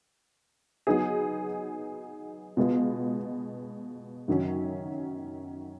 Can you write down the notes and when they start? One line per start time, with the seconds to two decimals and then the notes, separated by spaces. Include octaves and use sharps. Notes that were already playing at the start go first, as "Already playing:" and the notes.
0.87 F#3 B3 D#4 G#4
2.57 B2 G#3 B3 F4
4.28 F#2 D#3 F#3 C#4